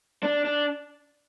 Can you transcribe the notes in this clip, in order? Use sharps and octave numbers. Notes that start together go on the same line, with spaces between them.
D4
D4